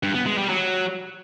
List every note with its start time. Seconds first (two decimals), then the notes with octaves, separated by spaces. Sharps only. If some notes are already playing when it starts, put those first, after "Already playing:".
0.03 G2
0.15 B3
0.26 G#3
0.38 G3
0.49 F#3